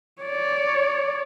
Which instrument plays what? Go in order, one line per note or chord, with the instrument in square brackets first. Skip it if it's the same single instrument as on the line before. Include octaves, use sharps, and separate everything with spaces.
[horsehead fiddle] C#5 D5